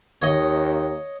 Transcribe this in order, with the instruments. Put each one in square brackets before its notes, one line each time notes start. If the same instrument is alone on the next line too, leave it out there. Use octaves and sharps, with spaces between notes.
[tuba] D#2 [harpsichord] C#5 D#5